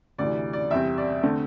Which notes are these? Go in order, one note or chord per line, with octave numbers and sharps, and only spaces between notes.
D2 C3 E3 D5
D5
E2 C3 G3 C4 E5
D5
D3 A3 C4